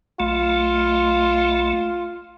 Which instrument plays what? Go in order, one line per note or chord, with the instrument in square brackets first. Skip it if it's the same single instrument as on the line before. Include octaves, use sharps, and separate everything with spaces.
[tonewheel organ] B1 A3 [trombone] F4